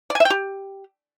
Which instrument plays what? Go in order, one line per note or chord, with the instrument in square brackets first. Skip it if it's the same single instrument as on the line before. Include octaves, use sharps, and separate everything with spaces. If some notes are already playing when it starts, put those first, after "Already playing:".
[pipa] D5
G#5
E5
G5
G4